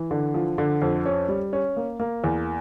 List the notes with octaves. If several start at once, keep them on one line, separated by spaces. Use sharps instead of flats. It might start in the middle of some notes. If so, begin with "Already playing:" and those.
Already playing: E3
D3
F3
D3
F2
C#4
G3
C#4
A#3
A#3
E2